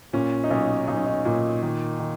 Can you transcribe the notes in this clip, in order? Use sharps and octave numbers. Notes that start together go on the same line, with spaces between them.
A#2 C#4
D#4
B1 C#4
B1 D#4
C#4
D#4
A#2
D#3
D#3